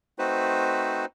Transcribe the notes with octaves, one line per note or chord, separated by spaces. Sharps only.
A3 C4 D#4 F#4 B4 C5